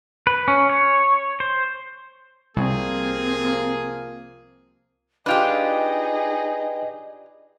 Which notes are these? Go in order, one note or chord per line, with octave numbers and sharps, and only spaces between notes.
B4
C#4
C#5
C5
C2 C3 F3 A#3 C4 G#4
D4 D#4 F4 G4 G#4 B4 D#5 G5